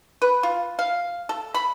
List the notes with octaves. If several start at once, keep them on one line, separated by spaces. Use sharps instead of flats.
B4
F4
F5
A4
B5